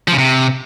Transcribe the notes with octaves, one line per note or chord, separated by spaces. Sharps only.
F3
C#3
C3